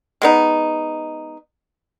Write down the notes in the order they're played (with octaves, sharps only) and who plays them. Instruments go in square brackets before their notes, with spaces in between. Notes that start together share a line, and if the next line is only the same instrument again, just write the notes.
[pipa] G#3 B3 D#4